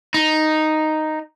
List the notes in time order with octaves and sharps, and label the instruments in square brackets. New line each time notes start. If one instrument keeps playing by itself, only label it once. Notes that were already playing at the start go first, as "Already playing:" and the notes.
[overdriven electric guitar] D#4